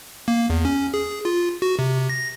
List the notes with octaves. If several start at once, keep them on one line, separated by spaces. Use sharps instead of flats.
A#3
E2
C#4
G#4
F4
F#4
C3
A#6